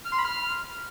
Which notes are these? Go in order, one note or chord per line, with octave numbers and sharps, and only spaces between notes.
F6
C6
B5
F6